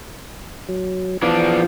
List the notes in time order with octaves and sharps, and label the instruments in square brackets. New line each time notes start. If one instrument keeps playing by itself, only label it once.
[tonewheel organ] F#3
[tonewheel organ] E3 B3 F5 [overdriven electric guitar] F3 D4